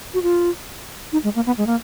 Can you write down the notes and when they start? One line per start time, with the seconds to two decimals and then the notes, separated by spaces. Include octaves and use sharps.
0.14 F#4
0.23 F4
1.12 D#4
1.24 G#3
1.35 A#3
1.46 B3
1.58 G#3
1.67 A#3